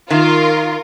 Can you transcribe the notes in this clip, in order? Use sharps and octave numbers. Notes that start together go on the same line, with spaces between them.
D#3 F4 A#4